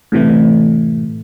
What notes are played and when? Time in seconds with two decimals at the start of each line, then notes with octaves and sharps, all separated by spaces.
0.12 A2 C3 E3 A3